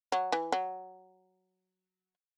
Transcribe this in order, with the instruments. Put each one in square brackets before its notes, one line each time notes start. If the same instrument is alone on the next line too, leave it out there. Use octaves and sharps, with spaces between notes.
[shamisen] F#3
E3
F#3